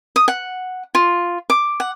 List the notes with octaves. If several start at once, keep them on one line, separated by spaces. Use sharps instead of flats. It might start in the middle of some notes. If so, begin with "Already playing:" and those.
D#6
F#5
F4
D6
F#5